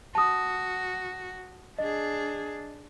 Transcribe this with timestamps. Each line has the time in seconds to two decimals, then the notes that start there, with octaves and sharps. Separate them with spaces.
0.15 F#4 A5 D#6
1.78 D4 G#4 D#5